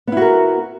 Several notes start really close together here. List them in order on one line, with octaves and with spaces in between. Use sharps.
B3 E4 F#4 A#4